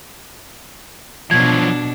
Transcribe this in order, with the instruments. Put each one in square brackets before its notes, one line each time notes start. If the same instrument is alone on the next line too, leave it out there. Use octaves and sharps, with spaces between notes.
[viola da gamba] B2 D4 [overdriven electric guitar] F3 F#3 [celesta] G#6